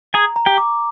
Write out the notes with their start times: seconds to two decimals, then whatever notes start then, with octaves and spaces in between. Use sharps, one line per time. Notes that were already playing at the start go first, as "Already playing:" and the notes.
0.14 G#4 G#5 A#5
0.36 A#5
0.46 G4 G5
0.58 D6